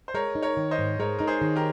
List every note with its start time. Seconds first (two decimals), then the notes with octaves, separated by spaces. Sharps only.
0.08 C5
0.14 G#3 A#4 C#5
0.35 D#4
0.43 A#4 C#5
0.57 D#3
0.71 C5 D#5
0.78 G#2
0.99 G#3 A#4 C#5
1.18 D#4 A#4
1.27 G#4 C5
1.41 D#3
1.56 G4 A#4